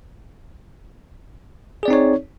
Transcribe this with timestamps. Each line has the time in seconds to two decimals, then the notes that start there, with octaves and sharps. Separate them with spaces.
1.83 G#4
1.85 D5
1.88 C4
1.90 D#4
1.93 C#5